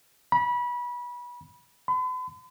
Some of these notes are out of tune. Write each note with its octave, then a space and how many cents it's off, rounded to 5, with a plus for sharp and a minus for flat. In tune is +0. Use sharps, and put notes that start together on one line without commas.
B5 -25
B5 +45